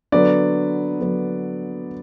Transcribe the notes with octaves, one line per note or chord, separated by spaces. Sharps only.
D3 F#3 B3 D5
D3 F#3 B3